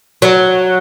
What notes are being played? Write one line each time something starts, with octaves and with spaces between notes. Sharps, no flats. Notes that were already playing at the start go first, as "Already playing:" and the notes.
F#3